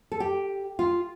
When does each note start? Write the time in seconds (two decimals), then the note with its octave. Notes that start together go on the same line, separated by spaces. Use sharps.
0.12 A4
0.20 G4
0.79 F4